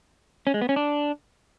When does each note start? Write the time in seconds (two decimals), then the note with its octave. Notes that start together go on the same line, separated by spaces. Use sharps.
0.47 C#4
0.54 G#3
0.61 B3
0.69 C#4
0.76 D4